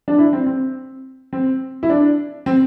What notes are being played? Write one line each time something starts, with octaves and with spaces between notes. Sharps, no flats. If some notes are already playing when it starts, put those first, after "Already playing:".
D4
E4
C4
C4
C4
E4
D4
C4